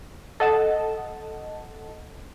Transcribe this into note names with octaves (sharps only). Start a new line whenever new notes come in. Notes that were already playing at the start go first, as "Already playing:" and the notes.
A4 D#5 F#5 A5